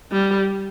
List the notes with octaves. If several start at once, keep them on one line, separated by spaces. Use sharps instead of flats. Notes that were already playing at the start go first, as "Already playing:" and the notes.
G3